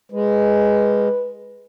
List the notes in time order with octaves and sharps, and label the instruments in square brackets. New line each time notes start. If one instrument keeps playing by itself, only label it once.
[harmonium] G#3 [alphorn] B4